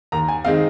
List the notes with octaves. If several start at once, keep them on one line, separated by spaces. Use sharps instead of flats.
D#2 A#5
G#5
D#3 G#3 C4 D#4 F5